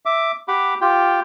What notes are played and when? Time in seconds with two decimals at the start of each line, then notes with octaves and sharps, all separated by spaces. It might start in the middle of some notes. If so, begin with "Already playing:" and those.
0.06 E5 D6
0.48 G4 F#5 B5 D6
0.81 F4 G4 G5